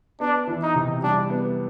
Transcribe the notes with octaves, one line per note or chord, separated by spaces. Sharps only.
B3 D4
E3
D#4
C3
G3 D4
B3